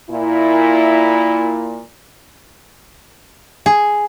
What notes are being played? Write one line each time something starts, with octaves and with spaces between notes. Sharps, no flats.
A#2 E4
G#4